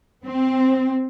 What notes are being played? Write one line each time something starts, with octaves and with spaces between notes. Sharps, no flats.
C4